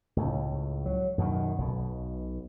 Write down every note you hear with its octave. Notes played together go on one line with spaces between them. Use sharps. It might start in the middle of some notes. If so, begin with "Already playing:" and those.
C#2 A2
F#3
F#2 B2 D3 D#3
B1 B2